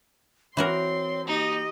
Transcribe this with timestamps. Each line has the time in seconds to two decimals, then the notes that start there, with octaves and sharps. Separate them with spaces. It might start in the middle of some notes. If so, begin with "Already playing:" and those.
0.57 E3 C4 F#4 A#4 C#5 C6
1.27 A#3 D#4 G4 D#5